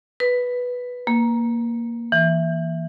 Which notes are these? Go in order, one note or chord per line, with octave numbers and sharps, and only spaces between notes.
B4
A#3
E3